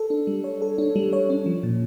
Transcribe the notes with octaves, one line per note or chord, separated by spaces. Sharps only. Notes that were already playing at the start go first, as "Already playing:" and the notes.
Already playing: A4
D4
G3
C#5
A4
D4
G3
C#5
C#4
F3
A#2